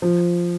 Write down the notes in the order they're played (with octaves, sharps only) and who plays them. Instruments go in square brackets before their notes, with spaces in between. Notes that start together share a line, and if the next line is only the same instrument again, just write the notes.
[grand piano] F3